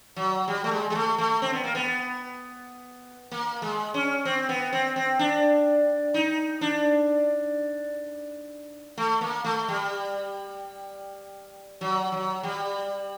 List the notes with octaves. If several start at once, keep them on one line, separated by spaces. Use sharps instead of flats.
F#3
G3
A3
G#3
G#3
A3
A3
C4
B3
A#3
B3
A#3
G#3
C#4
C4
B3
C4
C4
D4
D#4
D4
A3
A#3
A3
G3
F#3
F#3
G3